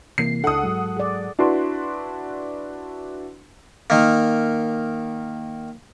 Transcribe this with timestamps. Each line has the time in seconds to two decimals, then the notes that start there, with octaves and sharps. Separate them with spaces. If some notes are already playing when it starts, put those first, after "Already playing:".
0.18 C3 E3 A#3 C7
0.44 C#2 D4 A4 F#5 D#6
0.63 G#2 F#3 G#3
0.97 G#4 D5
1.39 D4 E4 F#4 B4 C6
3.90 D#3 A#3